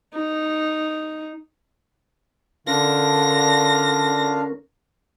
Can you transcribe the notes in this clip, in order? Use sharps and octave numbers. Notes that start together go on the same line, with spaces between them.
D#4
D3 C#4 D4 F4 A#4 F5 A#6